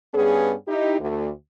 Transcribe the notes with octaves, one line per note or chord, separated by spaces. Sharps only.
G2 B3 C#4 G#4
D#4 E4 G4
D2